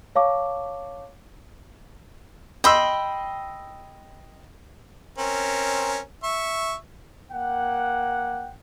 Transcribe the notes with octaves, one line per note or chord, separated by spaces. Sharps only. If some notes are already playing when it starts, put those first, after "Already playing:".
C#5 F5 A5 C#6 D6
D#5 G5 B5 C6 E6
C4 C#4 A#4
E5 C#6
A#3 F#5 G5